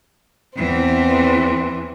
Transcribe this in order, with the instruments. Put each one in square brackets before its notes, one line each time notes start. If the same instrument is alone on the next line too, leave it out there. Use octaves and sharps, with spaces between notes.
[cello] E2 E3 [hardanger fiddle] C4